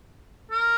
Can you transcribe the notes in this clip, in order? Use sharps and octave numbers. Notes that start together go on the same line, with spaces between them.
A#4